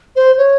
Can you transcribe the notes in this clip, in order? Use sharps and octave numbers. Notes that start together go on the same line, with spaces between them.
C5
C#5